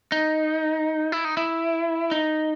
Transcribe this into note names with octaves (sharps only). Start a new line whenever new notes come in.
D#4
E4
D#4
E4
D#4